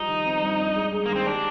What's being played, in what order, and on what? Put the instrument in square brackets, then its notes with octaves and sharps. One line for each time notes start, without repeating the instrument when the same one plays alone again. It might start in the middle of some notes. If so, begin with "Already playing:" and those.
Already playing: [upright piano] F3 G3 [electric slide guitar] D#4
[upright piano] D#3
C4
G2
D4
G#3
G#4
[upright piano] D#3 [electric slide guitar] A#3
[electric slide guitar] C4
[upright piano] G3 [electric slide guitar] D4